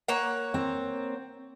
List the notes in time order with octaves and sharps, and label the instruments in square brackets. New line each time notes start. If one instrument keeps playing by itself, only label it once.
[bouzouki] A#3 C#5 F#5
[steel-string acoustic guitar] C4